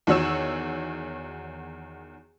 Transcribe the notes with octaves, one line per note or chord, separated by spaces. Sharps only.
E2 D#3 F#4 C#5 E6 E7